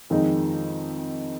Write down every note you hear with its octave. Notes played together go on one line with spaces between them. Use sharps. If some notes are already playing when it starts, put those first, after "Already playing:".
F2 D#3 G#3 D#4